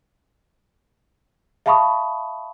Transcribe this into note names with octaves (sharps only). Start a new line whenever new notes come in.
E5 F5 A5 B5 C#6 D#6